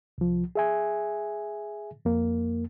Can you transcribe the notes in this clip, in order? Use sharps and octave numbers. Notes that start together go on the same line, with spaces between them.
C2 F3
G#4 E5 G#5
F2 A#3